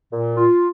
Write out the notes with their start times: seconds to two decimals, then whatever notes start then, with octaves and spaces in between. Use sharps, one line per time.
0.12 A#2
0.37 F4